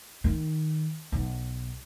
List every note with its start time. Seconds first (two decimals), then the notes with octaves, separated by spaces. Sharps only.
0.24 D#3
1.12 B1